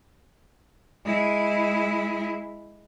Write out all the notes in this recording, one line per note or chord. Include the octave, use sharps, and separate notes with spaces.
G#3 E4